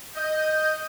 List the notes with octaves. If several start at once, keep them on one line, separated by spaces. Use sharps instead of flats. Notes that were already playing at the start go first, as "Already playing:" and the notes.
D#5 G6